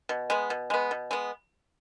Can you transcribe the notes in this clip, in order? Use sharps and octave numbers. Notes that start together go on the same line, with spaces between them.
B2
G#3 B3
B2
G#3 B3
B2
G#3 B3